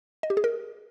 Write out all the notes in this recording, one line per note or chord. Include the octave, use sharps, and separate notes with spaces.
D#5
G4
G#4
A#4